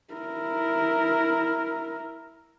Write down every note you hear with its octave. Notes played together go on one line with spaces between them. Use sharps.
E4 A#4